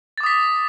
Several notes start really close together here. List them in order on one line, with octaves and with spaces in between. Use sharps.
A6 D6 D#6 B6